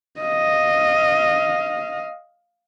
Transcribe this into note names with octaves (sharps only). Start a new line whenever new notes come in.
D#5 F5